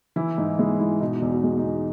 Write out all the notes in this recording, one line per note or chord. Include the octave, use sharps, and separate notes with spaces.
E3 E4
G#2 D#4
G#3 E4
G#2 E4
B2 D#4
E2
F#4
G#3
D#4
E2